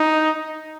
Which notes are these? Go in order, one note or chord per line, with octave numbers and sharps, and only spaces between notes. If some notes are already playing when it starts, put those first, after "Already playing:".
Already playing: D#4